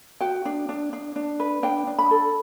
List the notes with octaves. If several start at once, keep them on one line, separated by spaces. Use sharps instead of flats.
F#4 G5
D4
D4
D4
D4
B4
D4 G5
D4
B5
A4